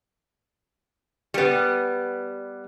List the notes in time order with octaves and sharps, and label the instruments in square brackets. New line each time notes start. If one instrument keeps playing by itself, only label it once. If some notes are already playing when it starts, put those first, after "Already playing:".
[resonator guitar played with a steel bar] G3 B3